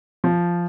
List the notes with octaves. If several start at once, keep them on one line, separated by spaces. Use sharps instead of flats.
F3